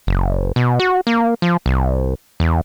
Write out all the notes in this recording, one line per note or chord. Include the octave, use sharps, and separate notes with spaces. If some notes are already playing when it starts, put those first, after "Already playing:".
F#1
B2
F#4
A#3
F3
C2
E2